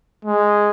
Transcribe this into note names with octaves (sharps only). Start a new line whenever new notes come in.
G#3